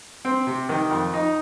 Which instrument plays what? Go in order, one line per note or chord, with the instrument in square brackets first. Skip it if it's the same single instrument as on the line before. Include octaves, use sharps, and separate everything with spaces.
[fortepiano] C4
C3
D#3
F2
D#4